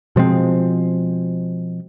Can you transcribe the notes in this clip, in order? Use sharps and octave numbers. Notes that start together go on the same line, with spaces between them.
B2 F3 G#3 C4